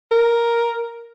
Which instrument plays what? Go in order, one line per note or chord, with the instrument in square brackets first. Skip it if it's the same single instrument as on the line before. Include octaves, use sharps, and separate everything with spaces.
[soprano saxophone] A#4